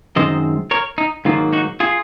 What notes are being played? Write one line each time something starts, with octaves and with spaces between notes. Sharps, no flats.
F#2 D#3 G#3 C4 C5 D#5
A#4 C#5
D#4
G#2 D#3 F#3 A#3 F4
D#4 F#4
F4 G#4